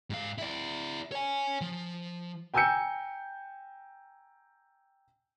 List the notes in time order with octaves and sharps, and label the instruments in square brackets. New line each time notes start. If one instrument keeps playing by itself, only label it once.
[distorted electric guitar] G#2 F5
E4 D5
C#5 G#5
F3
[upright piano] G5 G#5 A#5 E6 G6 C#7